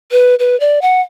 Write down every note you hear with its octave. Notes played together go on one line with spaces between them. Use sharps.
B4
B4
D5
F#5